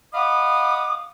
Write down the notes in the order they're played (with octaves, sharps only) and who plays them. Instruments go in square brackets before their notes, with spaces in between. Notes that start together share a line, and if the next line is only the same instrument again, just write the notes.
[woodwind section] D#5 F5 F#5 B5 D6 D#6